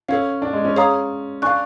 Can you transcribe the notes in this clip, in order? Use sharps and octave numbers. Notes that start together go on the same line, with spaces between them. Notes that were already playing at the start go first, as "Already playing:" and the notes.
C#4 A4 C#5 F5
D4
G#3
C#4
G#4 C#5 F5 A#5 D#6
D4 F5 G#5 C#6 F#6